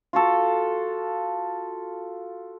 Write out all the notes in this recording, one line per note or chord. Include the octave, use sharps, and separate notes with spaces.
F4 F#4 A4